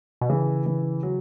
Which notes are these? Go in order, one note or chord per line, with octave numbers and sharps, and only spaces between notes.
B2
C#3 E3
E3
F#3